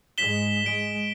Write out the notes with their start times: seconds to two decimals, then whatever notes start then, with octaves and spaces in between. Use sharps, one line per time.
0.18 G#2 G#3 B6 E7 G7
0.66 G#3 D7